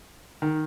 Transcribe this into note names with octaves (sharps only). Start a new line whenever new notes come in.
D#3